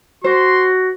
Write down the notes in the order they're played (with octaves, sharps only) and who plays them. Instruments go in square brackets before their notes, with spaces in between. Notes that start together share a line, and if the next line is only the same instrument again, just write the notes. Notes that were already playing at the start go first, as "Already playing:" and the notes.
[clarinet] F#4 [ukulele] C5 [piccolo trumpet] C6